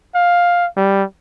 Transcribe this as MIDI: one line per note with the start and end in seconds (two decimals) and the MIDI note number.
0.15 0.67 77
0.77 1.04 55